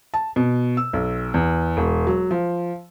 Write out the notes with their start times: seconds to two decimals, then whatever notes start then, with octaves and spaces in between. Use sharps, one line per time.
0.14 A5
0.36 B2
0.77 E6
0.93 B1
1.34 E2
1.77 E1
2.07 F#3
2.31 F3